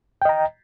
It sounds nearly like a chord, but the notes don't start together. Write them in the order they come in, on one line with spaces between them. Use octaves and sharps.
G5 D#5 A#5